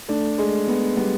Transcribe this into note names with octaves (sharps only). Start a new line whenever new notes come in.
A3 D4 A4
G#3
B3
G3 B3 G4